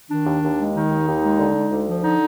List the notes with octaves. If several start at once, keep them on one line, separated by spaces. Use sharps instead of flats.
D#3 D4
D#2
D#2
G#3
D#3 D#4
D#2
D#2
G#3
D3
G#3
D2
F3
D3 D#4